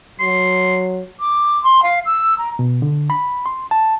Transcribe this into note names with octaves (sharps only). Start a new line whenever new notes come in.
F#3 C6
D6
C6
F5
E6
A#5
B2
D3
B5
C6
A5